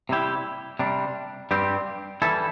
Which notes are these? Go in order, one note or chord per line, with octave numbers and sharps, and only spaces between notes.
C3 G3 E4 G4
C3 G3 D4
G2 G3 C4 G4
E3 G3 E4 A4